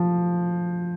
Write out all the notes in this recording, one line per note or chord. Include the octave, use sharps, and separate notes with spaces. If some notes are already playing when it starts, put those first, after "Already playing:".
Already playing: F3